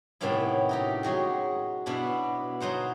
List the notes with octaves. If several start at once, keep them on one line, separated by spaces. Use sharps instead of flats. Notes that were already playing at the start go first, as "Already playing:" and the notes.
A2 C3 D#3 B3 C#4 E4
D#4 F#4 G4
F#3 G#3 F#4 G#4
B2 B3 D4 E4
F#3 D#4 C5 F#5